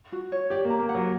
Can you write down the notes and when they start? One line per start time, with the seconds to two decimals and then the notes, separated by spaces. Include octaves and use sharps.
0.12 F#4
0.32 C#5
0.50 G4 D5
0.65 A#3
0.70 A#5
0.79 A#3
0.89 F#5
0.95 F#3